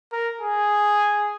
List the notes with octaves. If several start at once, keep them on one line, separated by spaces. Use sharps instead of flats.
A#4
G#4